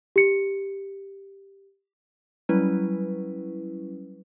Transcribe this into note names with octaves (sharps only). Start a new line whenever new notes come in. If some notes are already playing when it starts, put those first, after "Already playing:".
G4 C#7
F#3 G3 C#4 E4 B4